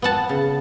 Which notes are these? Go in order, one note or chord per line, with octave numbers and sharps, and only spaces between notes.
B3 F#5 A5
C#3